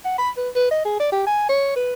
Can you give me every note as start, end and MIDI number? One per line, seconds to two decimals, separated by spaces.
0.05 0.17 78
0.18 0.30 83
0.37 0.49 71
0.56 0.68 71
0.71 0.83 75
0.85 0.95 68
1.00 1.09 74
1.12 1.25 67
1.27 1.49 80
1.49 1.73 73
1.76 1.93 71